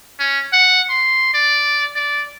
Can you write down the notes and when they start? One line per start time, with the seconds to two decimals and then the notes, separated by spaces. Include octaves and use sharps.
0.19 C#4
0.53 F#5
0.90 C6
1.34 D5
1.95 D5